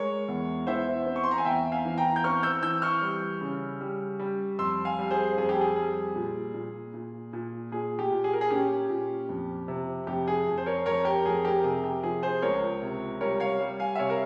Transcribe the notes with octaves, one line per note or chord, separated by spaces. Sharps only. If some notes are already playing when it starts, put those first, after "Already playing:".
Already playing: G#3 A#4 C#5
E2
E3 C5 E5
C4
C#6
C6
A#5
G#5
E2 E5 G5
F5 G#5
E3
G5 A#5
G6
C4 C#6 F6
E6 G6
E3 E6 G6
C#6 F6
G3
C#3
G3
G3
F2 C6 E6
F5 G#5
G3
G#4 C5
F2 G#4
G4
G#4
G3 G#4
A#2
A#2
A#2
A#2
A#2 G#4
G4
A#2
G#4
A#4
G#4
C#4 G4
A#2
F2
C3
F2 G4
G#4
F2
C5
A#4 C#5
F2 A#4 C#5
G4 A#4
F2 G#4
G4 A#4
C3 G#4
G4
F3 G#4
G#4 C5
C#2 A#4 C#5
C3
G3 A#4 C#5
C#5 F5
G3
F5 G#5
E5
C3 C#5 F5
A#4